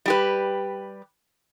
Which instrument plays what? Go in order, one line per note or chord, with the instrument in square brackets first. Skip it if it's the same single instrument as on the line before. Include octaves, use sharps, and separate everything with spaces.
[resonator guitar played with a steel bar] G3 G4 B4